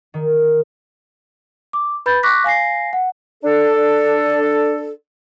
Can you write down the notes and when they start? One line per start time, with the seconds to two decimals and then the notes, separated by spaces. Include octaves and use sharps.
0.14 D#3
1.73 D6
2.06 B4 B5 G6 A6
2.23 C#6 D6 F#6 A#6 B6
2.44 F5 G#5 A#6 C7
2.93 F#5
3.44 D4 A4